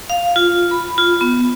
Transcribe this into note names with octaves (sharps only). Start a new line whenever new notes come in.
F5
F4
B5
F4
B3